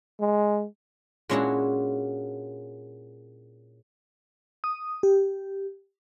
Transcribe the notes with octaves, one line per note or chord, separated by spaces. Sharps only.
G#3
A#2 G#3 C#4 D4 E4 F#4
D#6
G4